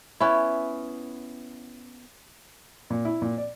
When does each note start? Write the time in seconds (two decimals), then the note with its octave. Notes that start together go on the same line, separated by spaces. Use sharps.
0.20 B3 C#4 E4
2.90 A#2
3.05 E4
3.22 A#2
3.38 D5